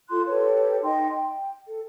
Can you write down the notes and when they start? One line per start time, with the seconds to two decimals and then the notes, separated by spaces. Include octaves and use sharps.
0.09 F4 A4 C6 F#6
0.28 G4 A4 B4 C#5
0.83 D#4 D#5 G5 C6
1.11 G5
1.66 A4